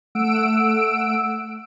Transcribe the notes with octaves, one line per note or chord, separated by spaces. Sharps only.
A3 F#5 E6 D7